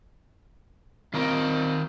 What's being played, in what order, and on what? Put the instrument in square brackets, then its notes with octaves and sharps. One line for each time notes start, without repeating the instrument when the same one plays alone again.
[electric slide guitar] D#3 F4 A#4 [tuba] C4